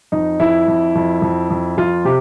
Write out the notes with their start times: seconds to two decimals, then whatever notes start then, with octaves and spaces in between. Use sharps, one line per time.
0.12 F2 D#4
0.39 F2 E4
0.68 F2
0.95 F2
1.22 F2
1.50 F2
1.77 F2 F4
2.05 C3 G4